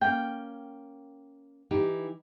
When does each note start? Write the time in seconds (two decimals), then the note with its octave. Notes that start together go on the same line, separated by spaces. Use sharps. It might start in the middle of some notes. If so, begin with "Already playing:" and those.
0.01 A#3 C#4 G5
1.71 E3 D#4 G4